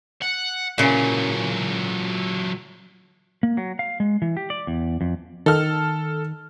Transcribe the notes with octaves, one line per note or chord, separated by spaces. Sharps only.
F#5
A#2 C#3 E3 F#3
A#3
F#3
F5
G#3
E3
G4
D5
E2
F2
D#3 A4 F6